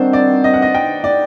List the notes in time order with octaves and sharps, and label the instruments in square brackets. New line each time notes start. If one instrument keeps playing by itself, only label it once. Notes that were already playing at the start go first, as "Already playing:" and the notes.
Already playing: [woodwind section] D#3 G3 C4 F#4 [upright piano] D4 C5
[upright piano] D5
D#5
F#5
D#5
G5
D5